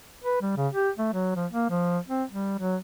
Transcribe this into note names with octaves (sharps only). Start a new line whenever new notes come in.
B4
G3
C#3
G4
A3
F#3
F3
A#3
F3
C4
G3
F#3